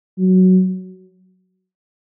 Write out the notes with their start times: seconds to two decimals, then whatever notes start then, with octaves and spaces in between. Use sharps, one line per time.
0.18 F#3